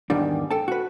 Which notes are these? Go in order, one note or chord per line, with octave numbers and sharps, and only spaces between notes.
E2 G#2 D#3 G3 D4
A4 G5 A5
F#4 B4